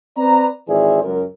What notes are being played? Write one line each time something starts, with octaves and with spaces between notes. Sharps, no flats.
C4 B4 D5 A#5
G#1 E3 G#4 C5 D5 E5
C#2 F#2 A#4